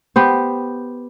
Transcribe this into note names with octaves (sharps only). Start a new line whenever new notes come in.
B3 G4 C5